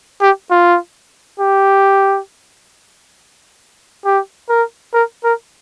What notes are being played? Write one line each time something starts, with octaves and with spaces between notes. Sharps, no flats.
G4
F4
G4
G4
A#4
A#4
A#4